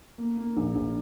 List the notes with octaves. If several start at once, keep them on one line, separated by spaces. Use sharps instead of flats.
A#3
A#3
A#1
A#1